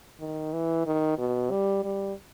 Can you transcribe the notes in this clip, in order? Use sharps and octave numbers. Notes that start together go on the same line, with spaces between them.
D#3
E3
D#3
B2
G3
G3